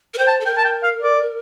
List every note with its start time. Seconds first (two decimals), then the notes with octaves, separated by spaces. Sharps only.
0.14 A#4
0.18 C5 G5
0.28 A5
0.41 A4
0.46 A#4 G5
0.57 A5
0.65 G5
0.84 F5
1.02 D5